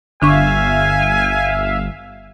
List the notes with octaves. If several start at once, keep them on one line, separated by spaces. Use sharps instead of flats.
G1 D3 D4 E5 F5 G#5 C#6